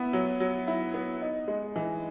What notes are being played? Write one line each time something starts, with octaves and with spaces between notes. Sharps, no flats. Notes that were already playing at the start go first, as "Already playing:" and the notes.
Already playing: B3 E4
F#3
F#3
E4
B3
D#4
G#3
E3